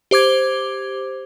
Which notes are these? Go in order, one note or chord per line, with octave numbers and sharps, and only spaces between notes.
G4 C5 D6 G#6